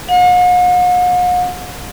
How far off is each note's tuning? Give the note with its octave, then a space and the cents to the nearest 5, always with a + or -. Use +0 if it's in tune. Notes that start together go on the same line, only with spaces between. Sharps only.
F#5 -45